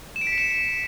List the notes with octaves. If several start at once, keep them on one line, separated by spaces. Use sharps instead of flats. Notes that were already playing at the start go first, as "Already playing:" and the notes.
E7
D7
B6
C#7
E7